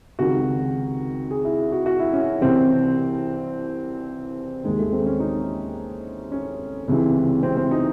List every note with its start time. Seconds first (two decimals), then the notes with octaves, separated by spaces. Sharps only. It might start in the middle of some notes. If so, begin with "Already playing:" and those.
0.19 C#2 C3 D#3 F#4
1.31 G#4
1.45 E4
1.72 F#4
1.86 F#4
1.99 E4
2.13 C#4
2.41 C2 C3 E3 C4
4.64 D#2 D#3 G#3
4.79 A3
4.93 C4
5.06 C#4
5.20 D#4
6.32 C#4
6.88 C#2 C3 E3
7.43 C4
7.57 C4
7.71 D#4